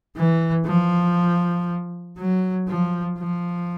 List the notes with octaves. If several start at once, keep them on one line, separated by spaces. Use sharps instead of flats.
E3
F3
F#3
F3
F3